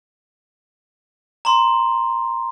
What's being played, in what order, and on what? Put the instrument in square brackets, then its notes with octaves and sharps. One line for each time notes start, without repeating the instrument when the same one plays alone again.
[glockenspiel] A#5 C6